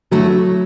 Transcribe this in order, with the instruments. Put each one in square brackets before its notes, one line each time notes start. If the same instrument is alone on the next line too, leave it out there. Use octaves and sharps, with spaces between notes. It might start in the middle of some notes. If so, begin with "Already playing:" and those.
[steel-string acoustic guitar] D3 A3 E4 [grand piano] F#3